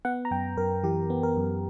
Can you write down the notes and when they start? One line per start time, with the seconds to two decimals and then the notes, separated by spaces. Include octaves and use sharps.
0.05 B3 F#5
0.25 A#5
0.31 F#2 G5
0.57 F#2 A#4
0.83 E3 G4
1.10 B3
1.23 A#4
1.37 F#2